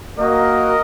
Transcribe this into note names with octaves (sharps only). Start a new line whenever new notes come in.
A#3 F#4 A#4 D#5